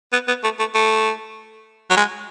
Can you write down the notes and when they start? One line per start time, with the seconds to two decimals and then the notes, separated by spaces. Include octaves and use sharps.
0.13 B3
0.28 B3
0.44 A3
0.59 A3
0.75 A3
1.90 F#3
1.97 G#3